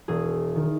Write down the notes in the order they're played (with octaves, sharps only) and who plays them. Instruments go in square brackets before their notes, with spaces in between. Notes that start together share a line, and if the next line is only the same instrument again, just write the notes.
[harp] E1 G#4
D#3